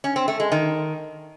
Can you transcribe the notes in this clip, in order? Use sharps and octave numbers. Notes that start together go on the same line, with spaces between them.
C#4
C4
A3
G#3
D#3